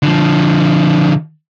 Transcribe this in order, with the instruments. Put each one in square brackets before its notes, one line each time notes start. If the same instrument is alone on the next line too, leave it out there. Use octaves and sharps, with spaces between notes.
[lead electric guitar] D3 F3